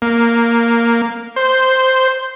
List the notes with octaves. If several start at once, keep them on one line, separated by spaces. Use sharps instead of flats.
A#3
C5